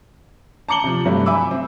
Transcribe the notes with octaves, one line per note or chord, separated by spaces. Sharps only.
A5 A#5 D6 C#7 F#7 G7
C3 F3
G2 C3 F#3 A3 E4
E5 G#5 B5 D6 E6
C4